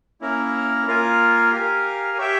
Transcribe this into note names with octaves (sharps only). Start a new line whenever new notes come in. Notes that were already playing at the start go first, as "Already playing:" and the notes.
A#3 C#4 E4 A#4
A#3 F4 A#4 F5 G#5
G4 A#4 F5 G#5
G4 C#5 E5 G5